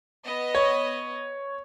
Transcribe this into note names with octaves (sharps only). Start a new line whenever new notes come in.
B3 D#5
C#5